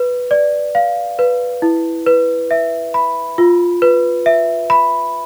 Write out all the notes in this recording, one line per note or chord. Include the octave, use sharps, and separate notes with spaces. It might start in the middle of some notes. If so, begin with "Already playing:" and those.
Already playing: B4
D5
F5
B4
E4
B4
E5
B5
F4
B4
E5
B5